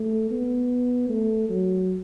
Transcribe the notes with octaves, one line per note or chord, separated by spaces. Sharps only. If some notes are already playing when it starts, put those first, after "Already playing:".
Already playing: A3
B3
A3
F#3